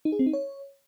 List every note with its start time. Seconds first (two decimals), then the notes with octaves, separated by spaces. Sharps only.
0.05 D#4
0.12 G#4
0.19 C4
0.26 D#4
0.33 C#5